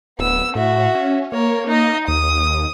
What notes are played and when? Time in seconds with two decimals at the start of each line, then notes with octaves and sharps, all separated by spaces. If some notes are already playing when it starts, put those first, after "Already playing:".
0.19 D1 B3 E6
0.55 A2 F#4 E5
0.95 C#4
1.32 A#3 A#4 C#5
1.67 D#4 D#5
2.08 D#2 D#6